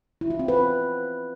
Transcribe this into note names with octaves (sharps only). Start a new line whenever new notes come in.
E4
F4
C4
B4